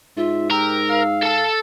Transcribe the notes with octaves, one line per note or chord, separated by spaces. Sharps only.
G#2 F4 E5
G4 A#4 E6
F5
A4 A5